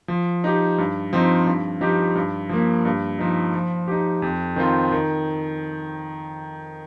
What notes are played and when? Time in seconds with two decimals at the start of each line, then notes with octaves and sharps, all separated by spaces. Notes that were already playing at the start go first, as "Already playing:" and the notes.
0.08 F3
0.44 D#4 G4
0.78 G2
1.13 F3 C4 D#4
1.46 G2
1.81 F3 D#4 G4
2.15 G2
2.49 F3 A#3
2.85 G2
3.19 F3 D#4
3.54 F3
3.88 D#4 G4
4.22 F2
4.56 D#3 C4 F4
4.92 D#3